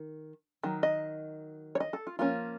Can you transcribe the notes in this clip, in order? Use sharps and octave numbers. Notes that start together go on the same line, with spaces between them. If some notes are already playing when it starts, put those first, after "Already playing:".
Already playing: D#3
D#3 F#3
D#5
C#5
D#5
A4
F4
F3 A#3 C#4 F4